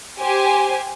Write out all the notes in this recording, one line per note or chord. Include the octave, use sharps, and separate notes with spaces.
G4 C5 G#5